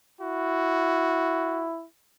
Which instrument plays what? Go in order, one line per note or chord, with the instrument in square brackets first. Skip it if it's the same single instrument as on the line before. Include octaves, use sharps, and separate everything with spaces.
[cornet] E4 [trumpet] F#4